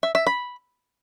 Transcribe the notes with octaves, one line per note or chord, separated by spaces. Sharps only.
E5
E5
B5